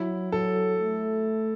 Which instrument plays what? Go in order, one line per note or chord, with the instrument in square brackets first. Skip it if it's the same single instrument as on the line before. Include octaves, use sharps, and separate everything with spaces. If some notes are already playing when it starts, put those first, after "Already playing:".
Already playing: [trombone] F#3 [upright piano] E4
[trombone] F#3 [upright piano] A4
[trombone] A3